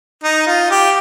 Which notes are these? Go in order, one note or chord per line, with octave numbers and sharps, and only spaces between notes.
D#4
F4
G4